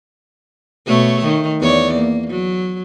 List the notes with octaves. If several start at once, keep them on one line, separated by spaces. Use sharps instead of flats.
B2 A3 C#5
D#3
E2 C#5 D5
A#3
F#3